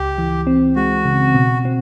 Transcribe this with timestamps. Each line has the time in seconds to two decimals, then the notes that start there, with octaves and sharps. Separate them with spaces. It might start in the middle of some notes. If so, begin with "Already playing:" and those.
Already playing: C#2 G4
0.18 E3
0.47 C4
0.76 G#3 F#4
1.05 C#3
1.35 B2
1.65 C4